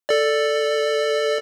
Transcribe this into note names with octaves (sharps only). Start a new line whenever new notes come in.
A4 D5